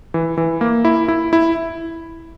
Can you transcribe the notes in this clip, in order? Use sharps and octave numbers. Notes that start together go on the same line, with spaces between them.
E3
E3
A#3
E4
E4
E4